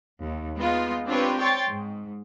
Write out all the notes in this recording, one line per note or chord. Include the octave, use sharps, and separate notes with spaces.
D#2
G#3 B3 D#4 F4
C4 D4 F4 G4 B4 C#5
C#5 G5 C6 C#6 A6
G#2